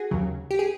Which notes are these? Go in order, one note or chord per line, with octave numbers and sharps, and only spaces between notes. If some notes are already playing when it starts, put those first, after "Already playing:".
Already playing: F#4 G#4
D#2 C#3 F#3
G4
G#4